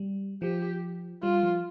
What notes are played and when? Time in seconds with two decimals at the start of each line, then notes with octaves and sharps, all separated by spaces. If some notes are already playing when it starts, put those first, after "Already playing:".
Already playing: G3
0.42 F3 G4
1.23 G3 F4
1.43 F3